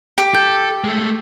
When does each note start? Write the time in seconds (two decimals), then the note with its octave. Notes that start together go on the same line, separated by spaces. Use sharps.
0.18 G4
0.35 A4 G6
0.84 G#3 A3